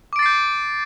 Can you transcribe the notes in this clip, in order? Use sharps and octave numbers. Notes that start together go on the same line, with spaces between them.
D6 G6 A6 C7 D7